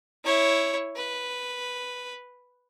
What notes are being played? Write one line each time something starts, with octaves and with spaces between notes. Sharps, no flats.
E4 C#5
B4